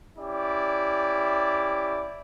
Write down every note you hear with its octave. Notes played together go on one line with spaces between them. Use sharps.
C#4 E4 G4 D5